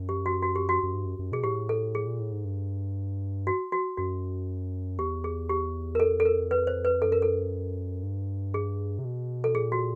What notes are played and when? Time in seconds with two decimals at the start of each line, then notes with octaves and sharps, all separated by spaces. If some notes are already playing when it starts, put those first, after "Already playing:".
Already playing: F#2
0.09 G4
0.26 F#4
0.42 F#4
0.55 G4
0.69 F#4
0.83 F#2
0.94 G2
1.05 F#2
1.19 F#2
1.32 B2 G#4
1.44 A2 G4
1.69 A4
1.95 G#4
2.07 A#2
2.20 A2
2.32 G#2
2.45 G2
3.47 F#4
3.72 F#4
3.97 F#2 F#4
4.99 E2 G4
5.24 G#4
5.50 G4
5.95 A#4
6.00 F2 A4
6.20 A4
6.25 A#4
6.51 B4
6.67 C5
6.85 B4
7.02 F#2 A4
7.12 A#4
7.22 A4
8.03 G2
8.54 G#4
8.99 C3
9.05 B2
9.44 A4
9.55 A#2 G#4
9.72 F#4